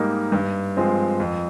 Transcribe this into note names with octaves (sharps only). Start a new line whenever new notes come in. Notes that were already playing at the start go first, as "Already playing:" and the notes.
Already playing: G#2 G3 A#3 D#4
G2
F3 G#3 C4
F2